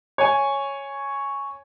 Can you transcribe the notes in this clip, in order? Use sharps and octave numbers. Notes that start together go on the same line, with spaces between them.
C#5 G#5